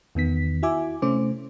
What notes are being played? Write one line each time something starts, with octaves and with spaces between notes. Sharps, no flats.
E2 D#3 B3 B6
E4 F#4 E5 G#5 D6
C3 A3 C#4 C5 D6